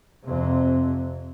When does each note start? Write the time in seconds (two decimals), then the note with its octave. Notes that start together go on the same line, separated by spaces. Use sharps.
0.24 F2 C3